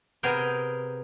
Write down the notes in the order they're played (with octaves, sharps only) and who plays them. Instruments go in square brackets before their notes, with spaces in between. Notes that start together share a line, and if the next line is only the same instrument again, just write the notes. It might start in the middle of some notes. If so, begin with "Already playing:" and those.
[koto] C3 B3 G#4 A#4 G5